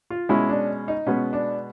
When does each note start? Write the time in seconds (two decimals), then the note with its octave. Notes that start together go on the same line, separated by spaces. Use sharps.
0.10 F4
0.29 B2 G#3 C#4 E4
0.49 D4
0.88 D#4
1.07 B2 G#3 B3 C#4
1.33 D4